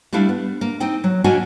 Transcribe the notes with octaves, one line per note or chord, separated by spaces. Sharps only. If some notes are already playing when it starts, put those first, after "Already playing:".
G3 A3 D4 E4 F5
B3
A#3
C4 D#4 G5
F#3
A#3 C#4 D4 F#4 D#5 G#5